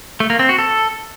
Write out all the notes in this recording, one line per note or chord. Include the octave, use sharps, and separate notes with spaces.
A3
A#3
C4
F#4
A4